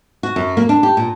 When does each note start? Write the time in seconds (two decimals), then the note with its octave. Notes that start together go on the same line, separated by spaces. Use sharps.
0.23 F#4
0.36 F#2
0.57 A#3
0.69 D4
0.83 G4
0.97 A#2